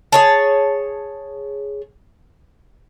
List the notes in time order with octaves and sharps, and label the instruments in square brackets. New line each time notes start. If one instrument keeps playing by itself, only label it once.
[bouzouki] G#4 C#5 A5